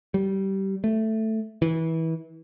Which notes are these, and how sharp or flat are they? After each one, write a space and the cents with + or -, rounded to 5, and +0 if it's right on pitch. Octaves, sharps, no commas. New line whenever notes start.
G3 -20
A3 +5
E3 -25